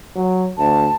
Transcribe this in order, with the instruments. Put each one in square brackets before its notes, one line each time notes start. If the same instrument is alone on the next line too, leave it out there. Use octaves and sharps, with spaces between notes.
[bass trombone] F#3
[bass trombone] D2 [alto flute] A5